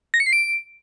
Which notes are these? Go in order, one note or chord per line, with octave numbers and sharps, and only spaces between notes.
A#6
C#7
C7
D7